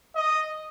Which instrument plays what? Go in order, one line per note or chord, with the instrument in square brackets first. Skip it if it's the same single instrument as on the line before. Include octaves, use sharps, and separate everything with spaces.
[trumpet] D#5